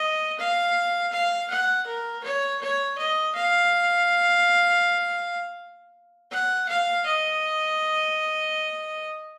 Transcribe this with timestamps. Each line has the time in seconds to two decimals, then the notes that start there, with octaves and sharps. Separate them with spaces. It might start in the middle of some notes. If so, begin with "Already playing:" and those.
Already playing: D#5
0.39 F5
1.12 F5
1.50 F#5
1.87 A#4
2.24 C#5
2.61 C#5
2.98 D#5
3.35 F5
6.31 F#5
6.69 F5
7.05 D#5